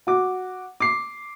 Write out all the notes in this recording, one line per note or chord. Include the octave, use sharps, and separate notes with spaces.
F#4 D6
D6 C7